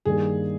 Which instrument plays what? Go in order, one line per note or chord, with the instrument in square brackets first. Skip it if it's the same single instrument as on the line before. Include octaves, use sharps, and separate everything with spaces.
[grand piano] G2 D#3 G3 A#3 [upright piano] G#4